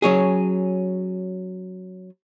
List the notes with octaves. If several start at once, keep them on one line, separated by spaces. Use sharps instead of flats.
F#3 C#4 G#4